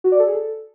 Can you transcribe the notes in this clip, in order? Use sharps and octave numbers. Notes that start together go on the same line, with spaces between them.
F#4
D5
A4
G#4
A4